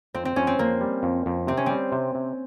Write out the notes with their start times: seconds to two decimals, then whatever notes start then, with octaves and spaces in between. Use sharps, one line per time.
0.14 F2 C4
0.25 C4
0.36 F2 C#4
0.47 C4
0.59 F2 A#3
0.81 G3
1.03 F2
1.26 F2
1.47 C3 C4
1.57 C#4
1.66 G3 C4
1.92 C3
2.15 C3